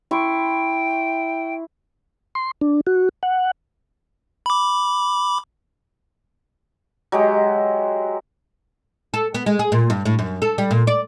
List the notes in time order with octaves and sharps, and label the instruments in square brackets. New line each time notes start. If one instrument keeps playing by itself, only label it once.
[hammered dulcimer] E4 C6 C#6 [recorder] G5
[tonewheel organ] C6
D4
F#4
F#5
[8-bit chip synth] B5 D6
[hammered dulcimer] F#3 G#3 G4
[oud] A4
B3
G#3
G#4
A#2
G2
A2
F#2
A4
G3
A#2
D5